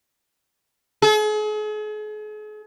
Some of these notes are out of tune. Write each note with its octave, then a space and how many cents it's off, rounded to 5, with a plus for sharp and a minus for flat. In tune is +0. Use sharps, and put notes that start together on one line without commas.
G#4 +40